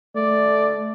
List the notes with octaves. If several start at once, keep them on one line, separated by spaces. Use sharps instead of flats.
A3 D5